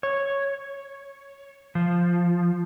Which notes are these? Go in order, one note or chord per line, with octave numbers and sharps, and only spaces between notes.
C#5
F3